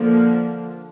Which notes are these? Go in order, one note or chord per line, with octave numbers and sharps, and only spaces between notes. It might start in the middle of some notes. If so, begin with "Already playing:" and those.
Already playing: D3 F3 A#3